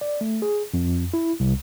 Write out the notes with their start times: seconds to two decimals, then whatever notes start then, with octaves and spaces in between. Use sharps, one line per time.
0.01 D5
0.21 A3
0.42 G#4
0.74 F2
1.14 E4
1.40 C2